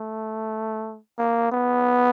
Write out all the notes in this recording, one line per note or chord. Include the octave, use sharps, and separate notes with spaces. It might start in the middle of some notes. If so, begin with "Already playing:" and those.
Already playing: A3
A#3
B3